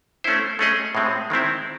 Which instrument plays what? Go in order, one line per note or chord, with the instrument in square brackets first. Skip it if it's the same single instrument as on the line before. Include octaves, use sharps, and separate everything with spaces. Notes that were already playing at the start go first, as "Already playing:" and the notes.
[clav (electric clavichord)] A3 C#4 E4 C5
A3 C#4 G#4 D#5
A2 G#3 C4
D#3 G#3 C4 E4